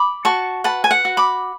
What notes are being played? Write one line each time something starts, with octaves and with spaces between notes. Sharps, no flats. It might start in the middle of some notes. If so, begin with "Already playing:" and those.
Already playing: B5 D6
F#4 A5 C#6
B4 F#5 A5
G#5
F#5
F#4
B5 D6